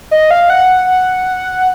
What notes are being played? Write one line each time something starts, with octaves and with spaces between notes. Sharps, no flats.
D#5
F5
F#5